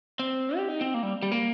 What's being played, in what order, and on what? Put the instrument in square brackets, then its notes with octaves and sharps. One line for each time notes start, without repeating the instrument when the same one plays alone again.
[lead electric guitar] C4
G4
D#4
C4
A#3
G3
G3
A#3